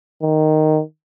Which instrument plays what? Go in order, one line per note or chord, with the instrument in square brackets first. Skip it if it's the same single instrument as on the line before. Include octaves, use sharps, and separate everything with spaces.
[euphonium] D#3